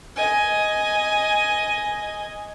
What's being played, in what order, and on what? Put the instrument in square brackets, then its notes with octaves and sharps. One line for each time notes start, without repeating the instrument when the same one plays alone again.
[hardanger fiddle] D#5 G#5